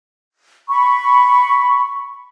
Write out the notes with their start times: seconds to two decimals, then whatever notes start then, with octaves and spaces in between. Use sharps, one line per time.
0.69 B5 C#6